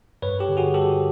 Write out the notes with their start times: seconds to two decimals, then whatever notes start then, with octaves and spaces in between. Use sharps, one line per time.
0.22 G2 B4 C#5
0.39 G4 A4
0.49 D3
0.57 F#4 G#4
0.74 G3 G4 A4